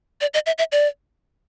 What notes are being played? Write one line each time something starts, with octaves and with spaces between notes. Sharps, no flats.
D5
D#5
E5
E5
D5